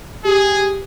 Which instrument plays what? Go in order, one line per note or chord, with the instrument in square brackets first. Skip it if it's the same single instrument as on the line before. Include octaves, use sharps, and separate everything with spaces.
[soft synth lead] G4 [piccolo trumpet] G#4